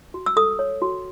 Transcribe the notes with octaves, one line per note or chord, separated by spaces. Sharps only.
F#4
E6
A4 D#6
C#5
F#4